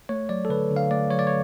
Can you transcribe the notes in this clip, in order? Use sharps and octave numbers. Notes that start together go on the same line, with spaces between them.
A3 C#5
F#3 D5
A4
D3 B4
D3
F5
A3 D5
F#3 C#5
D5
C#5